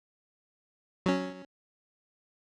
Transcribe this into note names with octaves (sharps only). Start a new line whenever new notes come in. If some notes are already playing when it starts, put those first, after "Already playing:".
F#3 C#4